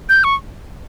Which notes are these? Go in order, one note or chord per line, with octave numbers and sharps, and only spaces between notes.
G6
C#6